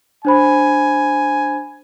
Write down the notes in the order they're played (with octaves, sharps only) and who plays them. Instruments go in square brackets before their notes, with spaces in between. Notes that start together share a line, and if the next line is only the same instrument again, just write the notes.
[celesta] D4 C5 B5 [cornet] G#5